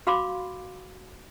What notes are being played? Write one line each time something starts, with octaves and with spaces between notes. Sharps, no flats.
F#4 F5 B5 C6 D6